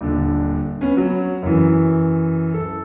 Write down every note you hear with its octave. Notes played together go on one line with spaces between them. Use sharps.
D#1 D3
B3 C#4
F#3
F#2 E3
A4